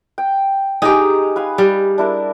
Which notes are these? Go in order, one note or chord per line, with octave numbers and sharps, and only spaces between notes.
G5
G#3 D#4 G4 G#4 A#5
B4 F5 G#5
G3
D4 E4 A#4